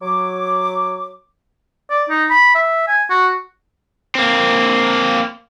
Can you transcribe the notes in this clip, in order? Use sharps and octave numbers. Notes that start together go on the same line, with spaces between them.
F#3 D6
D5
D#4
B5
E5
G#5
F#4
A#3 C4